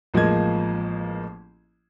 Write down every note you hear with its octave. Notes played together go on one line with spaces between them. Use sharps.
A1 F3 G#3 A#3 G#6